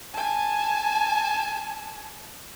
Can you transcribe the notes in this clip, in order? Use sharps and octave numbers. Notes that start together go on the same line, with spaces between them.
G#5 A5